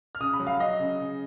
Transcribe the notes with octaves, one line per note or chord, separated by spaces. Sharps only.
F6
C#3 D#6
B5
F#3
F5
F#3 D#5
C#3
C#3